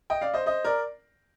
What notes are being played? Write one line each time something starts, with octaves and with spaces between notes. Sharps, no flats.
D#5 G5
D5 F5
C5 D#5
C5 D#5
A#4 D5